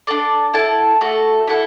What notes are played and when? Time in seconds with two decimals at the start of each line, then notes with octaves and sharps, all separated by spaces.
0.07 D4 A4 D5
0.54 E4 A4 F#5 A5
1.01 A3 F#4 A4
1.47 E4 A4 F#5